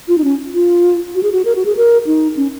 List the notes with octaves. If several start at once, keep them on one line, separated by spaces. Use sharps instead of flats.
F4
D#4
C#4
F4
F#4
G#4
F#4
A#4
F#4
G#4
A#4
D#4
C#4